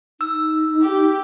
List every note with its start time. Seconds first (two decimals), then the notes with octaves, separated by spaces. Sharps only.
0.21 D#4 E6
0.86 G4